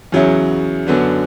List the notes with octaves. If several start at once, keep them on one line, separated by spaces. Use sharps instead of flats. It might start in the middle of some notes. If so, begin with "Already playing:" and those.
E2 C#3 F#3 C#4 E4
F#2 D3 F#3 B3 D4